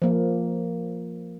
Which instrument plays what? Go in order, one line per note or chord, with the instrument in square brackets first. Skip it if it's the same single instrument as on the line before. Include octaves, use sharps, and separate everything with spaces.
[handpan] F3 A#3